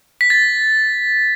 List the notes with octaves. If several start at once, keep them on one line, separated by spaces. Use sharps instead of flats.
B6
A6